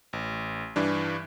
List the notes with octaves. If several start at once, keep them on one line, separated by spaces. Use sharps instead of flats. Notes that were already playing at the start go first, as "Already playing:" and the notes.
A1
G2 E3 D4